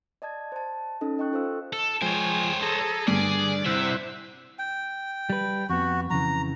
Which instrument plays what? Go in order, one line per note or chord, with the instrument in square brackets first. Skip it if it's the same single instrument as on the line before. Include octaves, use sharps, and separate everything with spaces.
[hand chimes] D5 D#5 A5 G#6
C5 A5
C#4 D#4 A4 D#5
A4 D#5 G5 C#6 F#6
F4 A4 C5 F5 E6
[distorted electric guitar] A4
[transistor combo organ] F3 G#3 [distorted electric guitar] C5 C#5 [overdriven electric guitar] G5 G#5
[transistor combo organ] G#4 A#5 D#6 [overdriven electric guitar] A4
[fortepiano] G2 [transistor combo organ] D3 [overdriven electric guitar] G#4 G#5 [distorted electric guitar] D5
[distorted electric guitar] C3 [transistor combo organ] E4 C5 F#5 [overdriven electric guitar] E5
[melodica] G5
[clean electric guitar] G3 B4
[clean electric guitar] F2 B3 [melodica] F#4
[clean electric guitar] F2 C#3 E3 [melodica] A#5